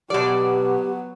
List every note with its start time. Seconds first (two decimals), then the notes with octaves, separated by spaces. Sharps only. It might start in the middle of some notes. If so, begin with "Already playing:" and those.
0.10 B2 F#3 B3 G4 D5